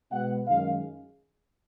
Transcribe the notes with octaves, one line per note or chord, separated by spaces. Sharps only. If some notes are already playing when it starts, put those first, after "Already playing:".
B2 G#3 B3 F#5
F#2 D#3 G#3 F5